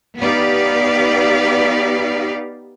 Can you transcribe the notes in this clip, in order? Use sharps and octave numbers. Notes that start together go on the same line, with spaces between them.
B3 D#4 G4 B4 D5 F5